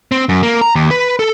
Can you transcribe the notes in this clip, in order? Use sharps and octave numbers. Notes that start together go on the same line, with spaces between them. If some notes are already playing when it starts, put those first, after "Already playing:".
C4
F#2
A#3
A#5
D#2
B4
A4